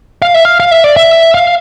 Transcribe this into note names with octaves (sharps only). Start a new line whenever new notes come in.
F5
E5
F5
F5
E5
D5
E5
F5